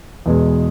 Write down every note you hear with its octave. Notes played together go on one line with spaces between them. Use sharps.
E2 B2 G#3